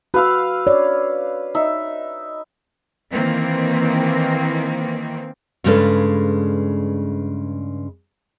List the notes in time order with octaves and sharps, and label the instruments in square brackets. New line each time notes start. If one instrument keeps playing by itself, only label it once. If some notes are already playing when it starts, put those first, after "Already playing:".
[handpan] F#4 [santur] B4 F5 E6
[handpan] C#5 D5
[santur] D#4 E5
[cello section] D#3 E3 A#3 C4
[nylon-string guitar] G2 C#3 G#3 D#4 A4 B4